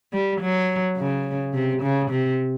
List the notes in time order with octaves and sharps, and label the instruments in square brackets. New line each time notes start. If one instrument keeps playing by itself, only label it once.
[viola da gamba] G3
F#3
C#3
C3
C#3
C3